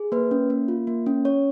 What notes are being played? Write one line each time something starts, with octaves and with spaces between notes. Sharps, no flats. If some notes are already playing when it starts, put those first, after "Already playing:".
Already playing: G#4
A#3 B4
C#4
A#3
F4
A#3
C#4
C#4 C#5